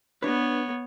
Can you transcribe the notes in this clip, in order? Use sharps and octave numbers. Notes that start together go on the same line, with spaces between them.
B3 D4 B4 C#5